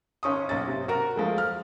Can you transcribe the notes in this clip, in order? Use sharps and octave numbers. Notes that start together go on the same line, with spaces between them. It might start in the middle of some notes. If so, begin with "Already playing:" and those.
G#1 C#4 C#6 D#6
B1 C#4 A6
C3
F#4 A#4
F3 G#3 A3
F6